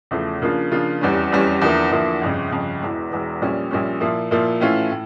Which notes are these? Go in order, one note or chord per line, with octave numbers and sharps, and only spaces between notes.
E2 C#3 F3 A3
C#3 F3 A#3 D4 F4
C#3 F3 A#3 D4 F4
F1 E2 E3 G3 C#4
F1 E2 E3 G3 C#4
E2 D3 F3 A#3 E4
E2 D3 F3 A#3 E4
G1 F2 C#3
G1 F2 C#3
E1 E2 E3
E1 E2 E3
A#1 A#2 G3 C#4
A#1 A#2 G3 C#4
A#2 F3 A#3 E4
A#2 F3 A#3 E4
A2 E3 A3 C#4 F4
A2